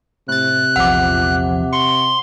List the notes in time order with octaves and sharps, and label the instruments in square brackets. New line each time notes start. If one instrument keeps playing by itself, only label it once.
[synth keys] A2 A6 [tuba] C3 [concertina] F#6
[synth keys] A#1 E2 F3 [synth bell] F#5 D6
[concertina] C6 [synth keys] C#6